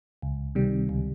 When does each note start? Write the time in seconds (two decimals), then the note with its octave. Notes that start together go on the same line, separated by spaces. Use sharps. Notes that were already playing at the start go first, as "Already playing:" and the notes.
0.22 C#2
0.55 C3 D#3 G3
0.89 C#2